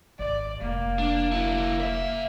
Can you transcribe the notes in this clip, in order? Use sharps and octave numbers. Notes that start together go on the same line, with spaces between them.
G#1 D5
F1 A#3
D4
F#3 E4
C#3 E5